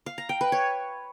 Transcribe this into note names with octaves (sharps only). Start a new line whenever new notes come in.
F5
A#5
G5
B4
C#5